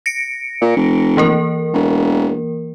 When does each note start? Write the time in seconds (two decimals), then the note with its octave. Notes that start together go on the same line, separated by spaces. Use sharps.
0.06 A#6 C#7 D7
0.62 A#2
0.76 F1
1.17 E3 A#3 A#4
1.73 E1